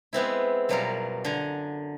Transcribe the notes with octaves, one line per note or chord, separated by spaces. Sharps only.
G#3 B3 C4 E4
F#2 B2 F#3 G3 F4 A#4
D3 G#5 A#5